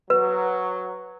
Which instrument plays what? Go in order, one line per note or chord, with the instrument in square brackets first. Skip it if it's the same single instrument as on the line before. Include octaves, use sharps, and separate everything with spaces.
[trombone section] F#3 [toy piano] B4